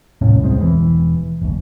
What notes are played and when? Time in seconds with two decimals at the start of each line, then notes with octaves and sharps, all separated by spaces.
0.21 D#1 C2 A2 C#4
0.43 C2 G#3 C4
0.59 E1 B2 E3
1.41 F#1 D2